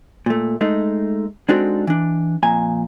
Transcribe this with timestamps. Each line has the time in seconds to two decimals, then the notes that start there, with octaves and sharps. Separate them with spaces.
0.26 A#2 A3
0.61 G#3 A3 D#4
1.49 G#3 C4 D4 D#4 F#4 A4
1.87 E3 D4
2.43 F2 A#2 G#5 A#5